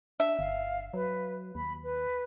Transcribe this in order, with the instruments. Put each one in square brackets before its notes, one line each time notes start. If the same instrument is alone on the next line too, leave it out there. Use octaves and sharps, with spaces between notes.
[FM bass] D4 [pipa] E5
[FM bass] G1 [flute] F5
[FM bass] F#3 [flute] B4
[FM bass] D#2 [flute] B5
[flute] B4